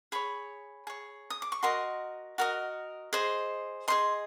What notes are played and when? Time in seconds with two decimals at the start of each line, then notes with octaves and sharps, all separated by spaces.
0.12 G#4 C#5 B5
0.87 G#4 C#5
1.30 D#6
1.42 D6
1.52 C#6
1.63 F#4 A#4 D#5 C6
2.38 F#4 A#4 D#5
3.13 G#4 C5 D#5
3.88 G#4 C5 D#5 C6